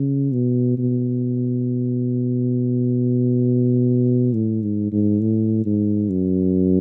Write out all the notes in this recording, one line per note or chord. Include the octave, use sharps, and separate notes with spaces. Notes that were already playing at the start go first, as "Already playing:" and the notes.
Already playing: C#3
B2
B2
A2
G#2
G#2
A2
G#2
F#2